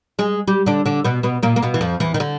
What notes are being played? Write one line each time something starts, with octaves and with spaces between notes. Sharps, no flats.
G#3 G#4
G3 G4
D3 D4
D3 D4
B2 B3
B2 B3
A#2 A#3
A#3
B2 B3
E3
F2 F3
E2 E3
D#3
D3